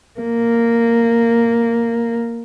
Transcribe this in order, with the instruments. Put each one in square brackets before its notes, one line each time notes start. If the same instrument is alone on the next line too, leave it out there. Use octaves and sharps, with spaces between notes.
[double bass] A#3